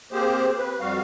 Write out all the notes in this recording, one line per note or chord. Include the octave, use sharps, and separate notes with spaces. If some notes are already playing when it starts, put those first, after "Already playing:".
A#3 C4 G4 G#4 C5
B4
F2 G3 F#4 F5